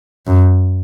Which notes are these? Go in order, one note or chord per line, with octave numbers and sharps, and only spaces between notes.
F#2